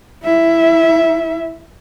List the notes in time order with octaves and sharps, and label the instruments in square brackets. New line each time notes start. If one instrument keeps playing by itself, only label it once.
[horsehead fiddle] E4 E5